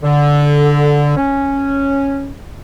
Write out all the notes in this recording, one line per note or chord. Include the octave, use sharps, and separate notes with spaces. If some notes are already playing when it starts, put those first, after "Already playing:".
D3
C#4